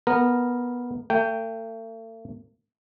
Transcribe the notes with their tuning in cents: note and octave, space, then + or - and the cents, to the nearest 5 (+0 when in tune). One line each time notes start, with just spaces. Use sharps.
B3 -15 A#4 +0
A3 +40 G5 +0